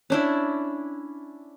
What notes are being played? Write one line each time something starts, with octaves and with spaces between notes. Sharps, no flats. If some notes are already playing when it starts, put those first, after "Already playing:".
C#4 D4 E4